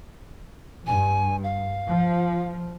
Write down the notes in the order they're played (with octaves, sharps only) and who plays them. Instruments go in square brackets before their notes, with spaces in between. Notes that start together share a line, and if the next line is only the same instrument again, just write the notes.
[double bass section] G2 [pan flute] G#5
[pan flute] F5
[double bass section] F3